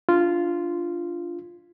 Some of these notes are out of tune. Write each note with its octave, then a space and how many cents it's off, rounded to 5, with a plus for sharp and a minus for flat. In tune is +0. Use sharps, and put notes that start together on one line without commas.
D4 +0 F4 -10